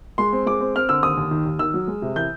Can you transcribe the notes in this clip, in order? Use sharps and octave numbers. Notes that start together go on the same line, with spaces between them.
G#3 C6
C4
G#3 D6
C4
C4 F6
D3 E6
D#2 D#6
D#2
D#3
D#2
D#3 E6
F#3
G#3
C3
E3 G6